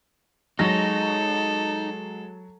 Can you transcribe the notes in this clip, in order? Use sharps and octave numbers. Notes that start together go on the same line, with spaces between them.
F#3 G#3 D#4 G#4 A4 A#6